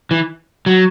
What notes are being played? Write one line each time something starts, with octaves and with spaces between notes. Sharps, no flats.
E3
F#3